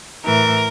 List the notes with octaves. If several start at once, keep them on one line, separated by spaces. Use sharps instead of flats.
A2 E3 A#4